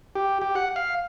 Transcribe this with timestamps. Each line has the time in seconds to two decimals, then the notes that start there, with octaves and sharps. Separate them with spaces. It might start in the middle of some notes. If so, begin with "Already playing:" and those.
0.15 G4
0.41 G4
0.55 F#5
0.76 F5